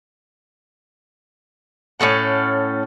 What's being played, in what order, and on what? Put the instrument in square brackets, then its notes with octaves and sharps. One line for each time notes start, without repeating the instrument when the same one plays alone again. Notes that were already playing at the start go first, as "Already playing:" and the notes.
[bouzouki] A2 C#4 A4 F#5